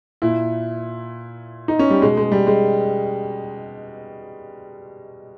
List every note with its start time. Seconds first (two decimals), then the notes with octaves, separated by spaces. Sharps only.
0.22 A#2 E4
1.68 D#4
1.79 C#4
1.90 G3
2.02 B2 G#3
2.17 G#3
2.32 G3
2.47 G#3